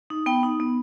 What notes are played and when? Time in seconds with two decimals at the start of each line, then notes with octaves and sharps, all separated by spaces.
0.10 D#4
0.26 B3 G5
0.43 D#4
0.60 B3